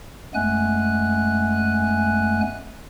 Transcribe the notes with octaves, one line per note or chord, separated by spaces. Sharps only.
F#2 G#3 A3 B3 G#5 F#6